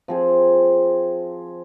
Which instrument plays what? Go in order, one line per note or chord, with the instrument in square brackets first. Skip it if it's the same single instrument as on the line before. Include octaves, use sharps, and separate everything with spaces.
[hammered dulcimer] F3 C4 G#4